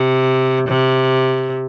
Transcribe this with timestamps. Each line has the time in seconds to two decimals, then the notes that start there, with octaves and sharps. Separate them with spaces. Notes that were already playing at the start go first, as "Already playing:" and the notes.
Already playing: C3
0.68 C3